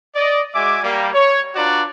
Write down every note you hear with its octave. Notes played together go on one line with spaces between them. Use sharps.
D5 D#5
G#3 F#4 E5 G#5 D6
G3 A#3
C#5
D4 F4 F#4 B4 D5 A#5